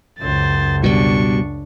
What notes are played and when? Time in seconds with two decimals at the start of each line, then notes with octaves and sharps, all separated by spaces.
0.19 C#2 F#2 C5 A6
0.84 B2 G3 D4 C#6